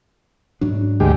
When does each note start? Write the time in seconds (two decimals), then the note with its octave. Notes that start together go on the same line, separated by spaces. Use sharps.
0.61 G#2 F#3 D4
1.00 D2 G#3 G4